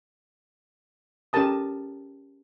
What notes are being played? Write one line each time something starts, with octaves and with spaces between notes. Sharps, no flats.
C#4 G4 A4 A#4 A5 D#6